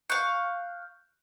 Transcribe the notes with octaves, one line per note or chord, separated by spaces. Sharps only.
F5 C#6 F#6 G6